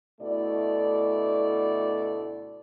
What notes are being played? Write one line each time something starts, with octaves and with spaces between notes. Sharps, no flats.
D2 B2 A3 E4 A4 D5